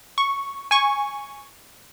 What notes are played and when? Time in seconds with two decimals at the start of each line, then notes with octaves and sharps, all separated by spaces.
0.18 C#6
0.71 G#5 C#6